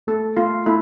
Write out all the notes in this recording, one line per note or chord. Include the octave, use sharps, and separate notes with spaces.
A3 A4
A3 F4
A3 E4